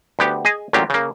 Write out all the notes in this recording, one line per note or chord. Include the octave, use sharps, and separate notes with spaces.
D2 B3 G4
G#4 D#5 G#5
A1 A#2 F#3 F4 G4
C#3 A#3